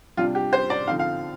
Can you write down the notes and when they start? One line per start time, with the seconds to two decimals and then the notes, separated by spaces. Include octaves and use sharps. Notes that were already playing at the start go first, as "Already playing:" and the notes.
0.17 C3 G3 D4 F4
0.35 G4
0.53 C5
0.70 D5
0.87 D3 F3 C4 D#4 F5
0.99 F5